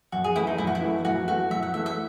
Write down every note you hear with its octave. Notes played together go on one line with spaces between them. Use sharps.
F#2 F#4
G#4
E3 A3 E4
D#4
F#2 E4
F#4
E4
E3 A3
F#2 F#4
E3 A3 F#4
F#2 E5
F#5
E3 A3 E5
E5